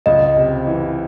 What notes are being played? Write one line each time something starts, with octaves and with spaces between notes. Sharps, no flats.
C#2 D#5
C3
E3